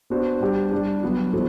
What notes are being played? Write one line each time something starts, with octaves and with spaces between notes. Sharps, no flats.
B3 D4 F#4 C5
G3 D4 G4
G3 D4 G4
F#3 B3 F#4
E3 B3 F#4 A4 C5